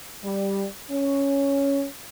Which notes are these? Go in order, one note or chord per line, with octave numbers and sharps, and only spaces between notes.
G3
C#4